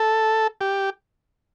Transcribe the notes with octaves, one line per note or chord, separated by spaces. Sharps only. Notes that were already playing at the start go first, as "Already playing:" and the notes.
Already playing: A4
G4